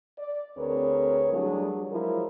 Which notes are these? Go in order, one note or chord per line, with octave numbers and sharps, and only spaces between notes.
D5
D2 C4 G#4 A#4 B4 C#5
F#3 G3 A3 D4 E4 G#4
F3 F#3 G#3 E4 A#4